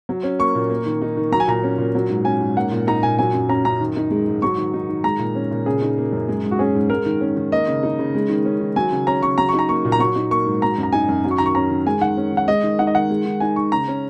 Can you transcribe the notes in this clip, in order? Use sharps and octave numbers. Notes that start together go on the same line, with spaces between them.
F#3
C#4
A#3 C#6
A#2
A#3
D#3
D#4
D#3
F#3 A#5
G#5
A#2 A#5
C#4
A#2
F#3
G#2
C#4 G#5
G#2
A#3 F#5
A#2
D#4 A#5
A#2 G#5
F#3 G#5
F#2
C#4 A#5
F#2 A#5
D#3
D#4
G#3
G#2
F#3 C#6
D#3
D#4
D#3
G#3 A#5
A#2
C#4
A#2
C#3 G#4
D#4
A#3
F#2
G#3
G#2
F#4
C#4 G#4
G#2
G#3 A#4
D#3
C#4
D#3
A#3 D#5
C#3
D#4
C#3
G#3
D#3
C#4
D#3
F#3 G#5
C#3
C#4 A#5
C#3 C#6
F#3 A#5
D#4 C#6
A#5
A#3 C#6
A#2
A#5
F#3 C#6
D#4
A#3 C#6
G#2
F#3 A#5
F#2
A#5
D#4 G#5
F#2
F#3
C#6
D#3 A#5
C#6
C#4 A#5
D#3
G#3 G#5
D#3 F#5
C#4
D#3 F#5
G#3 D#5
D#3
D#4 F#5
D#5
D#3 F#5
G#3
D#3
D#4 G#5
D#3 C#6
C#3 A#5
C#4